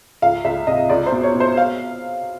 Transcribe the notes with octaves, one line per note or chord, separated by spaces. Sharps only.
C#2 F5
C#2 E5
C3 D#5
C#2 D5
C5
B2
C#5
B2
C5
F5